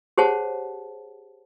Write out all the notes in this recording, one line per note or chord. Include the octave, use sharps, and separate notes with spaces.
G4 G#4 C5 C#5 F#5 A5